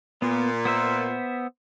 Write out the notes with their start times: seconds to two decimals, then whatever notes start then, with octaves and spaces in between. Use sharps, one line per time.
0.22 A#2 B3
0.65 B3 C5 E5